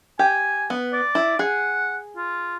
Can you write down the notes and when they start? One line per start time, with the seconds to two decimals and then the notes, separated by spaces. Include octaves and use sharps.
0.19 G4 G#5
0.70 B3
0.93 D5
1.15 E4
1.39 G#4 F#5
2.16 F4